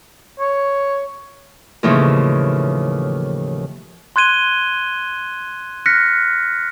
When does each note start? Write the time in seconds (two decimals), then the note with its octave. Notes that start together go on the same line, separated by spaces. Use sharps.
0.39 C#5
1.83 D#2 A2 C#3 E3 F3
4.16 C6 F#6 G#6 D#7 G7
5.86 F6 F#6 A#6 B6 C#7